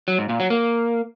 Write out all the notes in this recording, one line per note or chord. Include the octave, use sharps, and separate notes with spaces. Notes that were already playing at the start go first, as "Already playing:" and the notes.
F#3
G#2
A#2
F#3
A#3